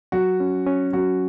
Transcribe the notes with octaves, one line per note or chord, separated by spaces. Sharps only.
F#3 F#4
C#4
C#4
F#3 F#4